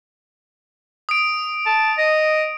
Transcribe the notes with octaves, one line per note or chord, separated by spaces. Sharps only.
D#6 D7
A5
D#5